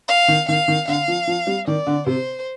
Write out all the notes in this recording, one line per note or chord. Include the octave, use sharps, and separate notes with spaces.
F5
D#3
D#3 F5
D#3
D3 F5
F3
F3
G3
D#3 D5
D3
C3 C5